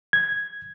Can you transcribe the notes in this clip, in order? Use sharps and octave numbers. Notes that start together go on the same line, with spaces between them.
G#6